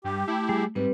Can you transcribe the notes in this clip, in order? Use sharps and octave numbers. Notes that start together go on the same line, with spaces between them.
G2 G4
A3 E4
G3 G#4
G#2 G3 C4 B4